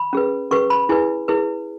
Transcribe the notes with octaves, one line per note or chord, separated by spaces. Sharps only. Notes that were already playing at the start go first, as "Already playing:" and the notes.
Already playing: B5
C#4 G#4 B4
C#4 G#4 B4 C#6
B5
E4 G#4 B4 G#5
E4 G#4 B4